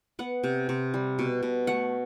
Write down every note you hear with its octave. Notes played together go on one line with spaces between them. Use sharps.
B3 F#5
C3
C3
G3
B2
B2
A3 F#5